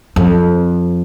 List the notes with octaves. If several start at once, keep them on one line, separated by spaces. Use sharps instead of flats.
F2